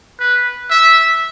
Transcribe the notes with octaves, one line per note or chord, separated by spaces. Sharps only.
B4
E5